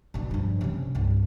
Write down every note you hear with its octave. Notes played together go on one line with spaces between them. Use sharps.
B2 D4
G2 F3
C3 C#4
C2 G2